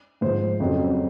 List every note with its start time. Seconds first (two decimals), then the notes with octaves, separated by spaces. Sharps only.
0.21 G#2 F3 C5
0.60 F2 C#3 F#3